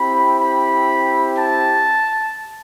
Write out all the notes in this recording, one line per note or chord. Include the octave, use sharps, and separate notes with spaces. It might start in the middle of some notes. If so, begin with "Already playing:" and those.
Already playing: C4 E4 G4 B5
B5
A5